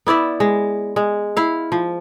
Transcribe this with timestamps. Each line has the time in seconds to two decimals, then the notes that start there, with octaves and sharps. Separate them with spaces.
0.07 B3 E4 D5 E5
0.40 G#3
0.96 G#3
1.37 E4 F5
1.72 F3